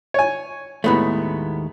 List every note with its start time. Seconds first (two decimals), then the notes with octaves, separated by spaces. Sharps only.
0.14 C#5 G#5
0.84 D#2 A2 G#3 A3 B3 B5